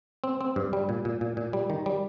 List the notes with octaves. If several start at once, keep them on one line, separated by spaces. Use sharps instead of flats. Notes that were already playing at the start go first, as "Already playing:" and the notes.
C4
C4
G2
G3
A#2
A#2
A#2
A#2
G3
D#3
G3